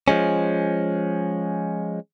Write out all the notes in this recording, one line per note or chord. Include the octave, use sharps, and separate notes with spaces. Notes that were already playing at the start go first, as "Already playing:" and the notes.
F3 G#3 C#4